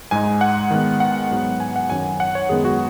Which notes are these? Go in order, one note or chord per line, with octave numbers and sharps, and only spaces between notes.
G#2 G#3 D#4 G#5
F#5
D#3 G#3 B3
F#5
G#2 F#3 B3
G#5
F#5
F#2 D#3 F#3 C#4 G#5
F#5
C#5
F#2 D#3 G#3 B3 G#4
F#4